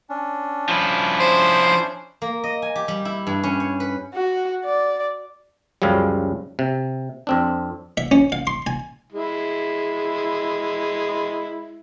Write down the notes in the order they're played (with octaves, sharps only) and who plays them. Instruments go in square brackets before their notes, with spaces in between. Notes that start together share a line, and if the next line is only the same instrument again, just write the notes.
[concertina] C#4 D4
[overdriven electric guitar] F3 E4
[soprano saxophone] C5
[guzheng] A#3
D#5
G#5
G4
G3
E4
G2
C#4
C#5
B4
[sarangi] F#4
D5
[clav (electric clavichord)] C#2 F#2 C#3 F3 G3
C3
F2 C4 D4
[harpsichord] E5
C#4
F5
C6
G#5
[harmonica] G#3 E4